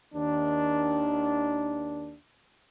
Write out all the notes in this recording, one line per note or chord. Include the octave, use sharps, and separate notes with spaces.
D#2 D#3 D4